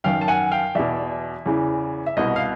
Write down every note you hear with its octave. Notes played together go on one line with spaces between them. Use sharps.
F#2 D#3 F5 G5
A5
F#5 G#5
F5 G5
E2 B2 D5 E5
E2 C#3 E3
E5
C2 B2 D#5
F5